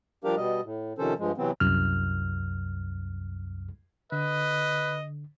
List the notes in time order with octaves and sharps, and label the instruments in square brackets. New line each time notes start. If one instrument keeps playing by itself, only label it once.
[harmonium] F3 G3 D4 G4 A#4 F5
B2 G3 D#5
A2
C3 D#3 F3 C#4 A4 C5
G2 F3 G#3
C3 E3 F#3 B3 C4
[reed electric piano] C2 F#2 F6
[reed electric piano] D3 [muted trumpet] B4 [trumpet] D#5